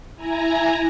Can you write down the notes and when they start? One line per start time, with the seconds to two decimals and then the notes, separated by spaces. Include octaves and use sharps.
0.16 E4 G#5 A#5